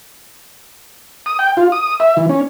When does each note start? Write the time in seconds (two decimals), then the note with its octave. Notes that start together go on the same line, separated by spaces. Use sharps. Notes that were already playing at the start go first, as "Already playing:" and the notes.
1.26 D#6
1.39 G5
1.57 F4
1.72 D#6
2.00 E5
2.17 E3
2.29 C#4